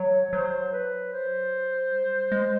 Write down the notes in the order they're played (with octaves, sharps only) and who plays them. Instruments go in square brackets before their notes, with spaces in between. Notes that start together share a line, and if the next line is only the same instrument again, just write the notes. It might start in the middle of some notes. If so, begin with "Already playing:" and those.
Already playing: [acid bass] F#3 [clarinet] C#5
[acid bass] F#3 [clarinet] C5
[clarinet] B4
C5
[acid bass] G3
G#3